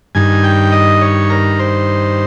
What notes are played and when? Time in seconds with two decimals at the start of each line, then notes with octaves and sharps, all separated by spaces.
0.15 G2 D#3 G#5
0.44 G5
0.72 D#5
1.01 C#5
1.30 A#4
1.59 C5